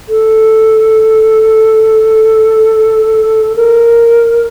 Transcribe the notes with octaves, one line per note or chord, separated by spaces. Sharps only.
A4
A#4